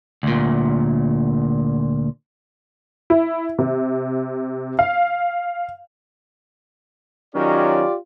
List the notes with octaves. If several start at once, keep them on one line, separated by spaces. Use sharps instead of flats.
D2 A#2
E4
C3
F5
D#3 F#3 C#4 F4 G4 D5